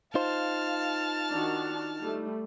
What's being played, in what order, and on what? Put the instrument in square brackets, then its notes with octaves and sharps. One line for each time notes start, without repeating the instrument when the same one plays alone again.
[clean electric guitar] D#4 F4 C5 [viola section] F5 [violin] A5 F6
[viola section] D#3 D4 F#4
G3 A3